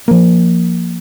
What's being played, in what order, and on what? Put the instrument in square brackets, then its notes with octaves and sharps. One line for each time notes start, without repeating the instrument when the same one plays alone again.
[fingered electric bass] F3 A#3